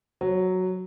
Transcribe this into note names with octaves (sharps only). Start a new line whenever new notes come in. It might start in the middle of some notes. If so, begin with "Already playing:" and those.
F#3